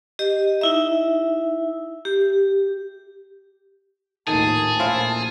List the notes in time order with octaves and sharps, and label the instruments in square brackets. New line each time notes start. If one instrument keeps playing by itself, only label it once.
[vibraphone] G4 D#5
D#4 E4 E5
G4
[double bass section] A#1 D#2 A2 [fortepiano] D#3 [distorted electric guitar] G#4 [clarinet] A5
[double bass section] A#1 A#2 [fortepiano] E4 C5 F5